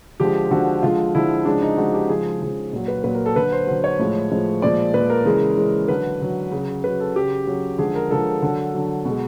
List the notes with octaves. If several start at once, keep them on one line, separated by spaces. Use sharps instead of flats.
D3 F3 G#3 G4
D3 F3 G#3 F#4
D3 F3 G#3 F4
D3 F3 G#3 E4
C#3 F3 G#3 D4
D#4
C#3 F3 G#3 F#4
G4
C#3 F3 G#3 G#4
C#3 F3 G#3
A#2 F#3
B4
A#2 F#3 B4
A#4
A4
D3 F#3 B4
C5
D3 F#3 C5
C#5
A2 F3 G#3
A2 F3 G#3
A#2 F3 G#3 D5
A#2 F3 G#3 B4
A#4
C#3 E3 G#3
C#3 E3 G#3
D3 F#3 B4
D3 F#3
C#3 F#3
C#3 F#3 B4
A4
C#3 F#3 G4
C#3 F#3
D3 F3 G#3 G#4
A#4
D3 F3 G#3 A4
D3 F#3
D3 F#3
B2 G#3